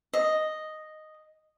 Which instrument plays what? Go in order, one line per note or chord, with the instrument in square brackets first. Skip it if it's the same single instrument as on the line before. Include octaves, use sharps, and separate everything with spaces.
[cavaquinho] D#5